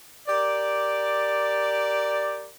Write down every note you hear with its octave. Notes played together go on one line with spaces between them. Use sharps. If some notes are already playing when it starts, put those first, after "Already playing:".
G4 A#4 D5